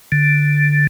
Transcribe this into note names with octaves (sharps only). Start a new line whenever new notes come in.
D3